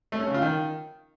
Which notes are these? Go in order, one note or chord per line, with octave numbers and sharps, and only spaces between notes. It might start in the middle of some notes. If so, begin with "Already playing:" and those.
A3
C#4
C#3
F4
D#3